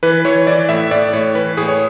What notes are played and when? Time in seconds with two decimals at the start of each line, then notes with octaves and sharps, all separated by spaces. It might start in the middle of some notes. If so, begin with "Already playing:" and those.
0.03 E3 B4
0.25 E3 C#5
0.47 E3 D5
0.69 A2 E5
0.91 A2 D5
1.13 A2 C#5
1.35 E3 B4
1.57 A2 G#4
1.68 C#5